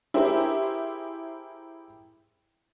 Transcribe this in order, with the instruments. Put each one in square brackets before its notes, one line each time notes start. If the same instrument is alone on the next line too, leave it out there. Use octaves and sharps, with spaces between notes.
[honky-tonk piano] E4 G4 G#4 A#4 C5